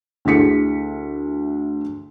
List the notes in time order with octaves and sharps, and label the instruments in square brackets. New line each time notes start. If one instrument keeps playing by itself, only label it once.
[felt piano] D2 E4 G#4 B6 C#7